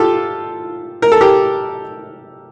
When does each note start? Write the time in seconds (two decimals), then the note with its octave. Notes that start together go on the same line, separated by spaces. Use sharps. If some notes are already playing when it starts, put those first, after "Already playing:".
Already playing: F4 G4 A4
1.02 A#4
1.12 A4
1.21 G4 A#4